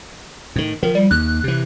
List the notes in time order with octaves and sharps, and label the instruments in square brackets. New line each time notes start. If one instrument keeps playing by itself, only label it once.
[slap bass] A2 D#3
[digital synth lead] D#3 [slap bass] F3
[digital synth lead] G3
[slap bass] D#2 [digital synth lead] F#6
[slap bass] C3 E3